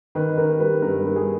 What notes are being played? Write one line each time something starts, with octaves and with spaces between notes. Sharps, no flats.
D#3 B4
D#3 A#4
G3 B4
G2 A#4
G2
G#4